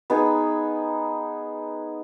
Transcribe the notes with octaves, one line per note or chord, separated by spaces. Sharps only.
B3 D#4 G#4